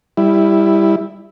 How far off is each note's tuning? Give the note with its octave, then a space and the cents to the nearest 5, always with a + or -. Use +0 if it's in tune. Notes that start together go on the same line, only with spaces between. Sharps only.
G3 +15 E4 +0